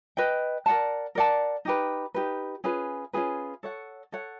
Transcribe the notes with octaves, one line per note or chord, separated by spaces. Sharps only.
B4 D#5 G5
A#4 D5 F#5 A5
A#4 D5 F#5 A5
D#4 G4 B4
D#4 G4 B4
C#4 F4 G#4 B4
C#4 F4 G#4 B4
A4 C#5 F#5
A4 C#5 F#5